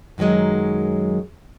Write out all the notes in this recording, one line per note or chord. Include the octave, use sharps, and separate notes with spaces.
F#2 D#3 F3 F#3 G#3